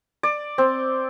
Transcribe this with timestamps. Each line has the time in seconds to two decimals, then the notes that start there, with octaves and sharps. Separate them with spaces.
0.23 D5
0.58 C4